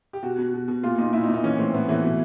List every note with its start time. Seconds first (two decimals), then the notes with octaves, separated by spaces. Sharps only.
0.13 G4
0.23 B2 F#4
0.38 B2
0.54 B2
0.68 B2
0.83 A#2 F4
0.98 A#2 D#4
1.13 A#2 E4
1.24 D#4
1.29 A#2
1.34 D#4
1.44 E3 C#4
1.58 A2 C4
1.74 A2 B3
1.89 E3 A3
2.04 B2